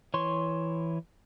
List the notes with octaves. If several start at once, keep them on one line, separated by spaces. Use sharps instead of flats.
E3 C#5 C6 C#6